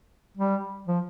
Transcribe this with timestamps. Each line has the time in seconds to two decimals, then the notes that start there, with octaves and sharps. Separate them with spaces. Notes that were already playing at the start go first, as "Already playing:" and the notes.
0.37 G3
0.87 F3